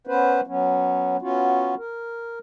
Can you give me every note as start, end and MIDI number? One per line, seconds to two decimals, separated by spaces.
0.07 0.41 59
0.07 0.41 61
0.07 0.41 71
0.07 0.41 72
0.47 1.17 54
0.47 1.17 59
0.47 1.17 61
1.22 1.75 59
1.22 1.75 61
1.22 1.75 65
1.22 1.75 66
1.78 2.39 70